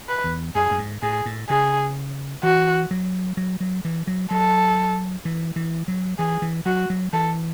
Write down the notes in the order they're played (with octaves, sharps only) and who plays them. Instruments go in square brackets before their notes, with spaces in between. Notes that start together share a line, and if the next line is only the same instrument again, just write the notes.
[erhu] B4
[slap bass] E2
[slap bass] F#2 [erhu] G#4
[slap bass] F#2
G#2
[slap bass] A2 [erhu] G#4
[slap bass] A2
[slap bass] C#3 [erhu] G#4
[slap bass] E3 [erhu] F#4
[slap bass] F#3
F#3
F#3
E3
F#3
[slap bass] F#3 [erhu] A4
[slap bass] E3
E3
F#3
[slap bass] E3 [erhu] G#4
[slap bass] E3
[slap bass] F#3 [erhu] F#4
[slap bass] F#3
[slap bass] E3 [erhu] A4